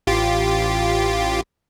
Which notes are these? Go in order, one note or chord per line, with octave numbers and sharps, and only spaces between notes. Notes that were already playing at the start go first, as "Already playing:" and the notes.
A1 F4 G4